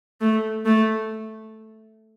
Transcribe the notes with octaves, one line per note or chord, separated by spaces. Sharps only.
A3
A3